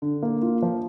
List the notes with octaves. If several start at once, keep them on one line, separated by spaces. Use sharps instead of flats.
D3
A#3
F4
F3